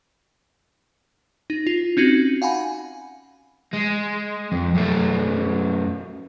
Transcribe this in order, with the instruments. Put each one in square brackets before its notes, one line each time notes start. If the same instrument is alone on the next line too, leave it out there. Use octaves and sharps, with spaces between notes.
[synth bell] D#4
F4
C4 C#4 D#4 F#4
F5 F#5 G#5 B5
[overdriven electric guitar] G#3
F2
F#2 A3